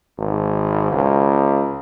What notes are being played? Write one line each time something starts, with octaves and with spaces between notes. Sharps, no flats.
G#1
C#2